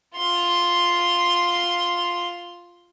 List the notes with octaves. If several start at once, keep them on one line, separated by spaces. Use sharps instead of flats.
F4 C6